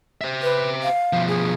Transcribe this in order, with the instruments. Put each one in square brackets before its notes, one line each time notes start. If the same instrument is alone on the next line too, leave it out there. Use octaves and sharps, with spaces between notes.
[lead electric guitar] C5 E5
[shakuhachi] B4
F5
[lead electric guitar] B2 F3
[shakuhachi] G#4